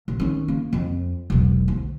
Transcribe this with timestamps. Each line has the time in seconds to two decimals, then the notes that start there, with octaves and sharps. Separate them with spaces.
0.08 A#1
0.20 D#3 C#4
0.48 A#3
0.73 F2
1.30 E1 B1
1.68 D2